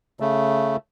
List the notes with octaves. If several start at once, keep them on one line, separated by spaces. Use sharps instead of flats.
C#3 A3